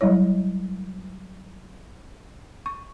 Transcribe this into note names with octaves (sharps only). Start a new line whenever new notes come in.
F#3 G3 E4 C#5
C#6